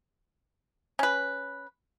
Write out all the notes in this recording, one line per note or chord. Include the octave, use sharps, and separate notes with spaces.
C#4 B4